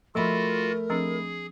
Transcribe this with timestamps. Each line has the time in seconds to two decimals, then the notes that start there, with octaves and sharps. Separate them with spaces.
0.15 F3 A3 F4 F#4 A#4 E5 B5 C6
0.90 F3 C4 D4 G#4